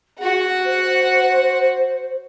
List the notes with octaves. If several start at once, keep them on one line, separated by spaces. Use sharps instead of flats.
F#4 G#4 F#5
C5